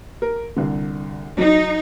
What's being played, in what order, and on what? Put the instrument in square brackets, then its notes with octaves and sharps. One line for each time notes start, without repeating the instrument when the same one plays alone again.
[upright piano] A#4
C2 D3
[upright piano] F#3 [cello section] D#4